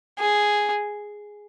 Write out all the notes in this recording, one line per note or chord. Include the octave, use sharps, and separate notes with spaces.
G#4